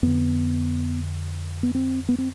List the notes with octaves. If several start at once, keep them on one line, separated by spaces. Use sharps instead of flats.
F2 D3 B3
B3
C4
B3
C4